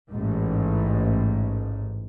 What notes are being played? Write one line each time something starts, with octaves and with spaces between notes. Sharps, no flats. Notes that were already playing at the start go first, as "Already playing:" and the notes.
A1 G#2